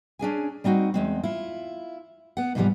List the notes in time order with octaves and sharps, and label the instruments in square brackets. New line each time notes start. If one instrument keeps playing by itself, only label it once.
[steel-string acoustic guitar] C#4 D4 G#4 G#5
G3 C4 D#4 F#4
E2 G#3 C4
E4 F4
B3 F#5
G#2 C3 E3 F3 G3 B3